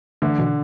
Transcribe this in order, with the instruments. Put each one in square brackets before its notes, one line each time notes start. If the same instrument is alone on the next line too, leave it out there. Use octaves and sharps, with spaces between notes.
[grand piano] D3 [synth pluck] E3 A3
[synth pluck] B2 E3